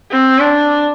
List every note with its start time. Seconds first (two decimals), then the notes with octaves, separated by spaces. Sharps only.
0.11 C4
0.39 D4